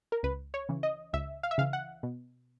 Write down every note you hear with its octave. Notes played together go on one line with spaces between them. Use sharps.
A#4
C#2 B4
C#5
C#3 E3
D#5
C#2 E5
F5
E5
C#3 E3 F5
F#5
B2